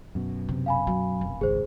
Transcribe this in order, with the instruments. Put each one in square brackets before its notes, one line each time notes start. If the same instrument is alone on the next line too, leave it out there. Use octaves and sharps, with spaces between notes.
[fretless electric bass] F#2 B2
[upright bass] C3
[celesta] F5 G#5 B5
[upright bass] F#3
F1
[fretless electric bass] G#1 C#2 [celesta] G#4 C5